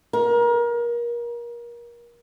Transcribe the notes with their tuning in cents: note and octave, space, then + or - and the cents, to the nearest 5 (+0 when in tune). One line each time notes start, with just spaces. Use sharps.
A#4 +30